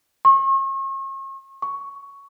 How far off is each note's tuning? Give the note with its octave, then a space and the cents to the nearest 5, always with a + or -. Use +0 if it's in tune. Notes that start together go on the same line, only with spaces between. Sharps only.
C#6 -40
C#6 +10